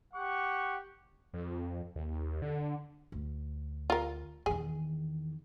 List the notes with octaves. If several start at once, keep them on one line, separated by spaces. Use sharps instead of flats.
G4 F#5 C#6
F2
D#2
D3
D2
F4 A#4
E2 D#3 G#4